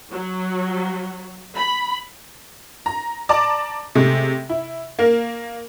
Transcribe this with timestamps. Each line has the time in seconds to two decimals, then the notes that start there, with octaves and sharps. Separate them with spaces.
0.10 F#3
1.55 B5
2.86 A#5
3.29 D5 A5 A#5 D6
3.95 C3 G#3 A3
4.49 E4
4.99 A#3 A#4